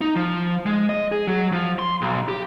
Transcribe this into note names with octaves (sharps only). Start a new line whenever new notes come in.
D#4
F3
G#3
D#5
G#4
F#3
F3
C6
B1
G4